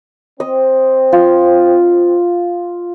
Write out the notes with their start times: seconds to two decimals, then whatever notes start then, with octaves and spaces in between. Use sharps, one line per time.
0.40 C4 D#5
1.12 F4